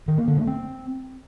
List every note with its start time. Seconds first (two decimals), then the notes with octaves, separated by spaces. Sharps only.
0.08 D#3
0.18 A#3
0.28 D3
0.37 A3
0.47 C4